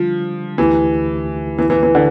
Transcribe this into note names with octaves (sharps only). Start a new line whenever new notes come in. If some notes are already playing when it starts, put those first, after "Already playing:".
Already playing: D3 F3 G3 D4 F4
D2 D3 E3 A3 E4 G4
E3
E3
E3
D3